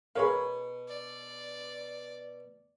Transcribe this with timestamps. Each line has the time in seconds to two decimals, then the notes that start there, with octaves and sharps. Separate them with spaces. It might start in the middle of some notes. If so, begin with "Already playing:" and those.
0.16 B2 G#4 A#4 C#5 F5 B5
0.88 D5